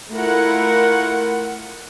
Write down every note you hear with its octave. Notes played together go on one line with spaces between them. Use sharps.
A3 E4 F4 A#4 F#5